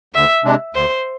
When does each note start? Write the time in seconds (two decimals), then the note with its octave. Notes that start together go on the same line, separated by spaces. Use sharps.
0.14 D2 E5
0.44 C3 G#3 D4
0.75 D2 C5